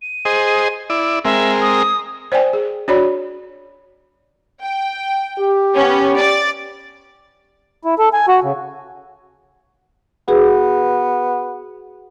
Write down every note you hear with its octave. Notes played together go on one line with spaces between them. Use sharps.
D#7
G#4 C5 D#5
E4 D5
G#3 C4 A#4 E5
D#6
C5 D5 G5 G#5
G#4
D4 F#4 C#5 D5 B5
G5
G4
B3 C#4
D5 A6
E4
A4
G#5
F#4
C#3
B3 F#4 G#4 B4